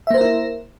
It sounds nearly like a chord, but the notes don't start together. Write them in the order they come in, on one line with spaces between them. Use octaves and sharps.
E5 A#3 C5 A#4 E4